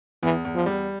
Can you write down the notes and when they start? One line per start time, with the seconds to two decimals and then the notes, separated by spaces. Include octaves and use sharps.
0.23 E2 E3
0.45 E2
0.55 F3
0.66 G3